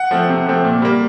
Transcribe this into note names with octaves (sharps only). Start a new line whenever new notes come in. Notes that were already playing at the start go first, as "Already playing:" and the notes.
Already playing: F#5
F3 A3 C4
C3
F3 A3 C4
A#2
G3 A#3